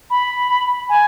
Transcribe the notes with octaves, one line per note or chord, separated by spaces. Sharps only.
B5
G#5